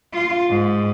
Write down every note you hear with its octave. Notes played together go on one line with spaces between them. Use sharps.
F4
G#2